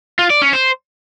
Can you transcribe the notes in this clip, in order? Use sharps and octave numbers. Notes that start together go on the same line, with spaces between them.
F4
D5
C#4
C5